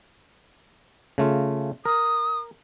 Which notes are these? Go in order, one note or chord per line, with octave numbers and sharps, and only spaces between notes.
C#3 A3 F4
A#4 D#6